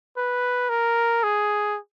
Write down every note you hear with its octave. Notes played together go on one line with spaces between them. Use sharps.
B4
A#4
G#4